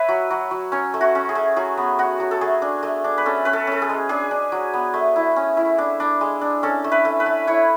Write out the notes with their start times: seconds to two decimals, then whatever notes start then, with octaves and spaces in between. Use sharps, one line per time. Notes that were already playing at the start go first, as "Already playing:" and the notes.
Already playing: B4 C#5 E5
0.09 F#3
0.31 F#3
0.51 F#3
0.72 C#4 C#5
0.94 A3
1.01 F#4
1.15 C#4
1.29 G#4
1.35 A3
1.56 F#3 G#4
1.77 B3
1.99 F#3 F#4
2.20 F#3
2.31 A4
2.41 A3 G#4
2.62 D4
2.83 A3
3.04 D4
3.18 B4
3.26 C#4 A4
3.45 C#4 B4
3.53 A4
3.67 C#4 A4
3.82 G#4
3.89 G#3
4.09 D4 G#4
4.31 D4
4.52 F#3
4.74 B3
4.94 A3
5.16 E4
5.36 C#4
5.57 E4
5.78 D4
6.00 D4
6.21 G#3
6.41 D4
6.63 C#4 A4
6.84 A3
6.92 B4
7.05 A3
7.20 B4
7.26 A3
7.47 E4 C#5